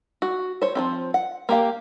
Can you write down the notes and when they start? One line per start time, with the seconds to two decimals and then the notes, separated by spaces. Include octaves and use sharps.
0.22 F#4
0.62 C5 C#5
0.75 F3 F#3 C4
1.14 F#5
1.49 A#3 G4 F5